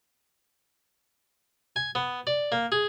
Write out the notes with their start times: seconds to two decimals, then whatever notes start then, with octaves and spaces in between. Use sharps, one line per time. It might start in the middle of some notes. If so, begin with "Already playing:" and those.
1.76 G#5
1.95 B3
2.27 D5
2.52 A#3
2.72 G#4